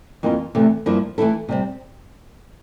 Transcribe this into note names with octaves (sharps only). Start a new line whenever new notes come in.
F2 E3 A#3 F4
E2 C3 E3 A3
G2 F3 A#3 E4
E3 A3 E4 A4
C3 G3 C4